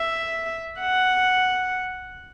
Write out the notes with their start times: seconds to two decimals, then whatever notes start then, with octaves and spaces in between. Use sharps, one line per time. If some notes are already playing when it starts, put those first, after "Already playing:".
Already playing: E5
0.80 F#5